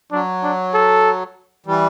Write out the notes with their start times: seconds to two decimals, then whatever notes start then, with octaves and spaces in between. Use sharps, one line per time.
0.12 F#3 D4
0.43 D4
0.74 A4
1.66 E3 G3